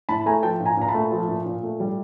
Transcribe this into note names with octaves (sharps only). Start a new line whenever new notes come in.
A2 A5 B5
A3 G#5 A#5
F3 G5 A5
A#2
G#5 A#5
A#2 A#5
A5 B5
A3
F3
A#2
A#2
A3
G3